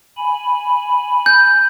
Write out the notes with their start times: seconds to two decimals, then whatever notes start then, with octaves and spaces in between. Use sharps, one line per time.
0.17 G#5 B5
1.26 G6